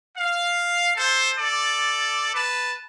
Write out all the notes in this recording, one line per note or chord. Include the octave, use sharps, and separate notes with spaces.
F5
A4 C5
A4 D5
B4 A5